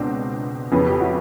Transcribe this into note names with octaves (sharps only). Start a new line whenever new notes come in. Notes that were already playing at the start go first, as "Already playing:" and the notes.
Already playing: C#2 B2 C4 D4
F2 C#3 E3 B3 C#4
F4 G4
E4 F#4